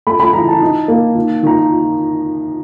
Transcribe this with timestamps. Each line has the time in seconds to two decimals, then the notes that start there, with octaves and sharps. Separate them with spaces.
0.07 A3 B5
0.20 B5
0.33 E3 A#5
0.48 A5
0.61 D#4
0.88 A#3
1.16 D#3
1.43 D#3 A#5